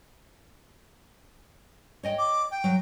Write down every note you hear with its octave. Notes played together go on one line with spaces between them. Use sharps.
C#5 D#5 G5
D6
G5
F#3